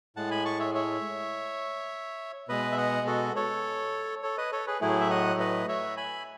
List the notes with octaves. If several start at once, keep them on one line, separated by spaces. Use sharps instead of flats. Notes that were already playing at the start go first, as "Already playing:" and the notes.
A2 G#3 F#5 A5
G#5 B5
A5 C#6
C#5 E5
C#5 E5
B2 G#3 B4 D#5
E5
D#5 F#5
F#4 A4
A4 C#5
A4 C#5
B4 D#5
A4 C#5
G#4 B4
A2 F#3 A3 E4 G#4
E5
D#5 F#5
B4 D#5
C#5 E5
G#5 B5